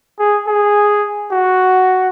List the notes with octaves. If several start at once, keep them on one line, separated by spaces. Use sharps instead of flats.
G#4
G#4
F#4